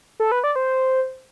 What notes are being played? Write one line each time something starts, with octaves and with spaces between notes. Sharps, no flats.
A4
B4
D5
C5